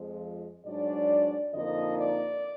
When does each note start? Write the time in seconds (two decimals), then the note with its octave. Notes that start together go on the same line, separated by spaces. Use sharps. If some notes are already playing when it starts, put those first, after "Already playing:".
Already playing: F2 F3 G#3
0.66 G#2 F#3 D4 D5
1.54 F2 D3 F3 A#3 D#4 D#5
1.97 D5